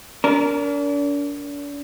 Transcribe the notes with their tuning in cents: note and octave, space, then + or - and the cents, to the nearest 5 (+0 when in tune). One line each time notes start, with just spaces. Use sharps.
D4 -35 A#4 +0